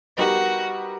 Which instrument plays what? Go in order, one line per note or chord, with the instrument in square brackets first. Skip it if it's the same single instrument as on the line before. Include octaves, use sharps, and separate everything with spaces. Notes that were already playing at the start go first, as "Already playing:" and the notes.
[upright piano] G3 B3 D#4 G4 A#4 [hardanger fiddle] F#4